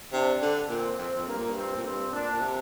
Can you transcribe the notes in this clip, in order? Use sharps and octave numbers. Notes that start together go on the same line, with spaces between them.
C3 D4
D3
A#2 C4
F2 C4
F2
G2 A#3
A#2
G2
C4
A#2
G2 C4
A#2 D4
A#2
C3